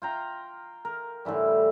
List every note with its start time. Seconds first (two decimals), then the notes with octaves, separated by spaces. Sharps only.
0.02 F4 G5 A#5
0.85 A#4
1.25 A2 D3 E3 G3